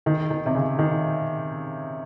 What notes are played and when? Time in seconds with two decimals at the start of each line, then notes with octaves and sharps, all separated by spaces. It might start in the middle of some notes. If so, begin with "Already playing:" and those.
0.06 D#3
0.30 D#3
0.46 C3
0.55 C#3
0.79 D#3